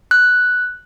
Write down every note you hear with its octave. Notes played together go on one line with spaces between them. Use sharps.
F#6